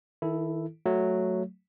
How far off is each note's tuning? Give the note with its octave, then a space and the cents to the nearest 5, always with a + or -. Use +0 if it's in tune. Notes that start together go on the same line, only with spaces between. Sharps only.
D#3 +30 E4 +0 A4 +0
F#3 +0 A3 +0